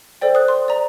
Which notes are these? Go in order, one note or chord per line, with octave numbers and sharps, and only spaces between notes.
A4 C5 D5 G5
D#6 F#6
C6
D5 A#5